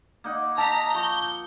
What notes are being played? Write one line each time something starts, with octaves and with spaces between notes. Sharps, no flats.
A#3 D#4 F#5
E4 D#5 A5 A#5 B6
F3 C#6 D6 G6